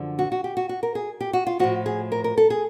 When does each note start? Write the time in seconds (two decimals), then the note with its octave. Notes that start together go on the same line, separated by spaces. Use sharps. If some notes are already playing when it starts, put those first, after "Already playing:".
Already playing: F#2 D3 F3
0.19 F#4
0.32 F#4
0.44 G4
0.57 F#4
0.69 F#4
0.83 A#4
0.95 G#4
1.21 G4
1.33 F#4
1.47 F4
1.59 A2 F3 F#4
1.86 G#4
2.12 A#4
2.24 A#4
2.37 A4
2.50 G#4